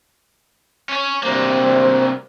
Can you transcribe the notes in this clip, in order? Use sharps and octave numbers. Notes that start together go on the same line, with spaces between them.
C#4 C#5
D2 C3 G3 A#3 C5